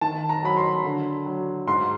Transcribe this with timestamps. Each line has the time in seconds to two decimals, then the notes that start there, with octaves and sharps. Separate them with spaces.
0.01 D#3 A5
0.29 A#5
0.43 F#3 B5
0.57 C6
0.84 D3
1.26 F#3
1.67 G#2 C6